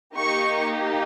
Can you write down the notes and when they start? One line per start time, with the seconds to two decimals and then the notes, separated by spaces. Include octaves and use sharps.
0.14 A#3 D#4 G4 C#6